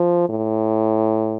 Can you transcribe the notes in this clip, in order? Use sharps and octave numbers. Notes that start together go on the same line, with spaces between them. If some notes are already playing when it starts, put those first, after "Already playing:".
Already playing: F3
A2